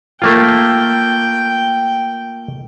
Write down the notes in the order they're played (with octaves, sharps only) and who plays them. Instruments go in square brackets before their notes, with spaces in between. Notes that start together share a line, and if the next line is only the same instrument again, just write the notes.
[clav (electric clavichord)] A3 A#3 F4 [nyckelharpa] G5